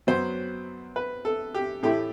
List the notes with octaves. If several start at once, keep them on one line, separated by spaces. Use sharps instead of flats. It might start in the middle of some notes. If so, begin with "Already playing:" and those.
F#2 F#3 B3 C5
B4
A4
G4
A2 E3 A3 E4 G4